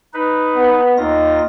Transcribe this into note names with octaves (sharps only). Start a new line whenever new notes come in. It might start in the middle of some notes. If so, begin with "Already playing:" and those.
D#4 B4
B3
D#2 D#4 F4 A#6